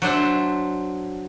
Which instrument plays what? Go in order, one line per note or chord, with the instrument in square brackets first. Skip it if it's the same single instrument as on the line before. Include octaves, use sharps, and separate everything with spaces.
[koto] F#3 D4 C5 E5